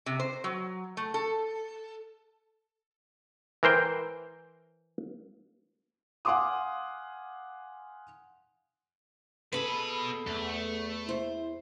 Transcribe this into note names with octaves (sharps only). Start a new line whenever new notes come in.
C3
C5
F#3
A3
A4
E3 A#4 C5 G5
F5 F#5 G#5 C6 D6 D#6
B2 G#4 A4 B4 B5
E2 A3
E4 C5